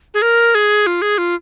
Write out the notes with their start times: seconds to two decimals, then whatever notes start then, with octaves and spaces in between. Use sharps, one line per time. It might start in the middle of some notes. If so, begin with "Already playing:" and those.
0.14 G#4
0.22 A#4
0.55 G#4
0.87 F4
1.02 G#4
1.18 F4